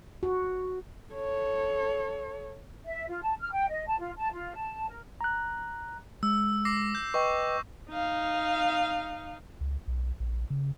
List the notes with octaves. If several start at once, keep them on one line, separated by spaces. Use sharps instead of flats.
F#4
A4 C#5
E5
F4
A5
F6
G5
D#5
A5
F4
A5
F4
A5
A#4
A#5 F#6
G#3 E6
D6 A#6 C7
G6
B4 D#5 G5 C#6
D#4 F5
C#2
B1
A#1
C#3